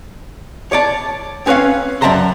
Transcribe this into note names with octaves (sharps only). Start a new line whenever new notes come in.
C#5 D5 A5
C4 C#4 B4 C#5 F5
F#2 D5 E5 A5 A#5 C6